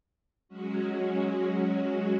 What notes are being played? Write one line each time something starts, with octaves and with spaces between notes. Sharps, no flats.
F#3 G#3 C#4 F#4